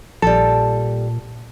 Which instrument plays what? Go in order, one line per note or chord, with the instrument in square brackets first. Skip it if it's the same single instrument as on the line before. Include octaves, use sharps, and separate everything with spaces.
[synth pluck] A#1 A5 [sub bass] A#2 [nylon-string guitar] G3 A4